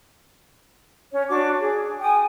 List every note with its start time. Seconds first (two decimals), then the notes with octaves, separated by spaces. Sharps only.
1.10 C#4 C#5
1.28 D4 F#4 D6
1.61 G#4
2.01 G5 G#5 D#6